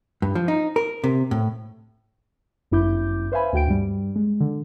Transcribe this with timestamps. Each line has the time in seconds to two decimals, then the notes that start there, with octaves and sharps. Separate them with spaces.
0.22 G2
0.35 F3
0.48 D#4
0.76 A#4
1.04 C3
1.31 A2
2.71 G1 F#2 E4 D6 G6
3.32 B4 C5 E5 F5 G#5 B5
3.53 D2 F#4 G5 D7
3.68 G2 G3
4.16 G#3
4.40 D3